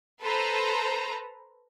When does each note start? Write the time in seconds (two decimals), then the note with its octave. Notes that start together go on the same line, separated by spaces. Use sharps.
0.22 A4 B4 C5 A#5